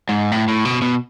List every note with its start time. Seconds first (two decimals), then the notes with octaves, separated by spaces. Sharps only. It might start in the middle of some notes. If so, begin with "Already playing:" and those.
0.09 G#2
0.32 A2
0.48 A2
0.65 B2
0.82 B2